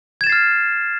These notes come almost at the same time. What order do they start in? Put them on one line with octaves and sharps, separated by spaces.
G#6 E7 A6 C7 F6